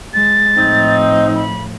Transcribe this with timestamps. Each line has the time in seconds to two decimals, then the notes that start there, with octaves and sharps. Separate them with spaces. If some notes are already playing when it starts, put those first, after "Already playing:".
0.14 G#3 A6
0.57 A2 F3 C4 D#4
1.35 B5